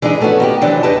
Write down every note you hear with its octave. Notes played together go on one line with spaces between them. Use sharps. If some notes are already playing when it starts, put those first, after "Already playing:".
E3 G#3 D4 D#4 G#4
F3 A3 B3 C#4 F#4
D#3 B3 G4
C3 E3 F#3 D4
E2 C3 G4 B4 D#5 A5